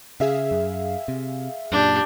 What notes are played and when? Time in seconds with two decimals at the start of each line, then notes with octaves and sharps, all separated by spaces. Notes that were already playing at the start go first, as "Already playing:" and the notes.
0.20 C#3 G#4 E5 F5
0.51 F#2
1.08 C3
1.72 F#2 A#2 D4 G4